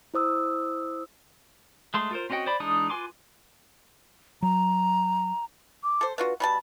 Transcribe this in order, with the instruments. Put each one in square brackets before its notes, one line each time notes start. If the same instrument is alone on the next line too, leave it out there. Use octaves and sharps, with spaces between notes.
[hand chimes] E4 C5 D#6 E6
[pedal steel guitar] G#3 A3 C6
F4 A#4 C5
C4 C#4 F#4 D#5 G5
C5 D5 B5
E3 G#3 D4 D#4 D#6
F4 B4 G#5 C6 D6
[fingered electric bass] F#3 [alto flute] A#5
[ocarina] D6
[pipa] A4 C5
[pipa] D4 F4 F#4 [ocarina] B4
[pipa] B2 G3 A5 [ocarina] B5